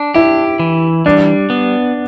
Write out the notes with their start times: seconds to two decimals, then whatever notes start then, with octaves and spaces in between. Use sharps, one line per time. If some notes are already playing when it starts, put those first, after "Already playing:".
Already playing: D4
0.14 E4 G4
0.59 E3
1.06 G3 D4
1.50 B3